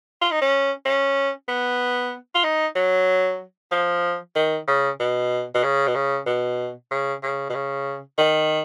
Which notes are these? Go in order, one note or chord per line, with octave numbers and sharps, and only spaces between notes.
F4
D#4
C#4
C#4
B3
F4
D#4
F#3
F3
D#3
C#3
B2
B2
C#3
B2
C#3
B2
C#3
C#3
B2
C#3
D#3